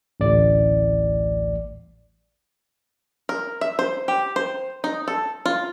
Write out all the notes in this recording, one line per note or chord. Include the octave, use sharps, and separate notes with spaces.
A1 D2 D5
A#4
E5
C5
G4
C5
D#4
A4
F4